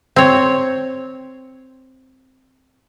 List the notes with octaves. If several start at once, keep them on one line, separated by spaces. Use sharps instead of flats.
C4 C#5